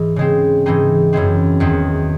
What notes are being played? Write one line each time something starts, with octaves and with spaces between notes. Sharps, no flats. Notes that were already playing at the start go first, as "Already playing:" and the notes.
Already playing: G#2 E3 D#4
C#3 G#3 C4
G#2 E3 G#3 C4 D#4
F#2 E3 G#3 C4
E2 D#3 F#3 C4